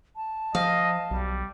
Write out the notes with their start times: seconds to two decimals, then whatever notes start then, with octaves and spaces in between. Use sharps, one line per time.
0.16 A5
0.55 F3 D#5 F5
1.11 B1 G3